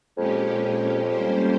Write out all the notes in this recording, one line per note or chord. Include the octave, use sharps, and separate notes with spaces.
F2 A#2 G#3 C#4 G4
G3 A#3 C#4 G4 C5